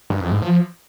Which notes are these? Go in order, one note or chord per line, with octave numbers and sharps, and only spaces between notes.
G2
F2
G#2
F3